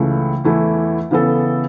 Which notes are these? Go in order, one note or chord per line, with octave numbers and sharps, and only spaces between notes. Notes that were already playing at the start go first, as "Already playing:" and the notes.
Already playing: C#2 C#3 E3 A3
E2 E3 A3 E4
C#3 E3 B3 A4